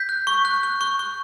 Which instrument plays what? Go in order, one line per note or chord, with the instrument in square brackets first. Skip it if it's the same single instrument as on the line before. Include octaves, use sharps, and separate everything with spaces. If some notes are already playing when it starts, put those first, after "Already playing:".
Already playing: [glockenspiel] G6 B6
F#6
C#6
F#6
F#6
C#6
C#6